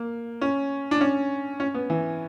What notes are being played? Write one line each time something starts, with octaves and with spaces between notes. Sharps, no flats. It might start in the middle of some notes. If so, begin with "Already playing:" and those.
Already playing: A#3
C#4
D4
C#4
C#4
B3
E3